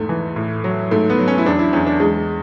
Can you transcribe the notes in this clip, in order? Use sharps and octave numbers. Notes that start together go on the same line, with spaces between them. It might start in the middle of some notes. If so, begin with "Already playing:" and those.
Already playing: E2 G#2 A3
E3
A2
F#3
G#2 A3
B3
F#3
C#4
E4
E2 D4
E4
E2 C#4
D4
E2 G#3